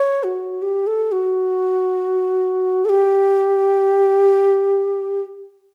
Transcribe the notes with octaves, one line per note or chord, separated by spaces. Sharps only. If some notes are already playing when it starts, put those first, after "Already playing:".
Already playing: C#5
F#4
G4
A4
F#4
A4
G4